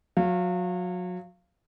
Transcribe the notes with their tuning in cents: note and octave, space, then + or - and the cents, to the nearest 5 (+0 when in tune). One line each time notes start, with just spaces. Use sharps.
F#3 -30 F5 -15